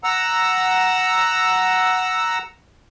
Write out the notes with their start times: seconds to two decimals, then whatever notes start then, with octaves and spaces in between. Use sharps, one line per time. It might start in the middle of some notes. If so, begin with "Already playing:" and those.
0.04 F#5 A#5 E6